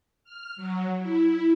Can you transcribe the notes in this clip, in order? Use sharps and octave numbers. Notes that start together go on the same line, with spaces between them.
F6
F#3
E4